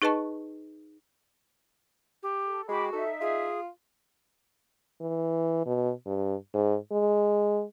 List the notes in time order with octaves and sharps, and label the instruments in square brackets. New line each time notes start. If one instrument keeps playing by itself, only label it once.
[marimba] D#4 G#4 B4 D#5 A5 C#6
[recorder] G4
[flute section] A4
[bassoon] G#3 [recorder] F#4 [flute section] G5 B5 D6
[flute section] D#4 E5 [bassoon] A4
[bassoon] F4 [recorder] G#4
[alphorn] E3
B2
G2
G#2
G#3